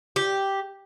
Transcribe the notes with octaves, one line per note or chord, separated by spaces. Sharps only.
G4